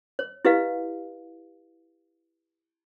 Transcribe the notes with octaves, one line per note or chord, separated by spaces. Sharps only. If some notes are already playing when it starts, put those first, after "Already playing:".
C#5
E4 G4 B4 D#5 F5